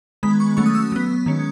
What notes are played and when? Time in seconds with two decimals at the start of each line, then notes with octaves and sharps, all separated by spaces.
0.23 D#3 G#3 B3 B5
0.40 C#6
0.57 F#3 A3 C#4 C#6
0.66 D#6
0.75 E6
0.92 F#3 B3
1.26 D#3 G#3 C#4